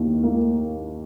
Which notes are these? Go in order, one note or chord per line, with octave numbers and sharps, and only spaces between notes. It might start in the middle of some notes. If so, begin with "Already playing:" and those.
Already playing: D#2 D#3
A#3